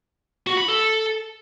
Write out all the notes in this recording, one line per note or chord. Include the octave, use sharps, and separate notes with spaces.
F#4
B5
A4